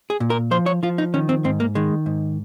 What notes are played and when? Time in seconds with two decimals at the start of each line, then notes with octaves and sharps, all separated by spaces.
0.10 G#4
0.20 A#2
0.30 A#4
0.51 F3 C5
0.66 C#5
0.83 F3 F4
0.98 D#4
1.14 D#3 C#4
1.29 C4
1.44 G#2 C4
1.60 A#3
1.75 D#3 G#3
2.06 G#2